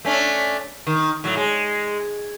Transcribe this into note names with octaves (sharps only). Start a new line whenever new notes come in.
A3 C#4 D4
D#3
A2 F#3
G#3